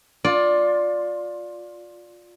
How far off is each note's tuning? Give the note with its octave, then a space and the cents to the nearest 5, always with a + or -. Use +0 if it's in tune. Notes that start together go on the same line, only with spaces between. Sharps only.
F4 +20 D5 +0